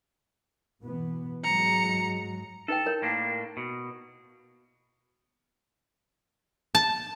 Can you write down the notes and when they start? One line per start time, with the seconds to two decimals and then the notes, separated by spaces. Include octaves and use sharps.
0.83 B2 E3 B3
1.44 G#2 F#3 G#3 A#5 C#7
2.68 D#4 A4 B4 G5
2.86 E4 A#4 C#5
3.02 A2 A#3 D4
3.57 B2
6.75 A5